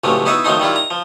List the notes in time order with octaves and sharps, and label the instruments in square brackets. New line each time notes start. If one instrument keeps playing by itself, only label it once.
[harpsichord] C#2 A2 C3 F3 F#3 A3
B3 D#4 E4 F#4 B4 E5
D#3 F3 F#3 A3 C4 D#4
D#3 G3 E4 F4
A#5
F3